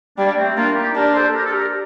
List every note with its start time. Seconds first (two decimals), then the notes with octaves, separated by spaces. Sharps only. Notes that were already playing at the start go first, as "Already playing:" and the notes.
0.18 G3 A#3 D4
0.37 A3 C4
0.56 A#3 D4 F4
0.76 D#4 G4
0.95 D4 G4 A#4
1.14 A4 C5
1.34 G4 A#4
1.45 A4
1.53 G4 A#4